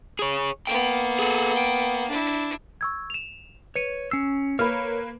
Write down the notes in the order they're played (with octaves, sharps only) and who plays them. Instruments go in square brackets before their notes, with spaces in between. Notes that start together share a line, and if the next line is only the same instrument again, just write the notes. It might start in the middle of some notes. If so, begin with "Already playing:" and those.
[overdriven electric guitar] G#4 C#5
[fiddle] A#3 B3 [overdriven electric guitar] G5
[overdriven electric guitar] G#4 A4
G5
[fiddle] D4 E4
[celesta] C#6 E6 G#6
E7 F7
[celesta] B4 C#7 D#7 [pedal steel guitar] C#5
[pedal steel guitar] C#4 E6 [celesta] C7
[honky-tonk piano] A#3 B4 [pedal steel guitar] C#5 [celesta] B5 F6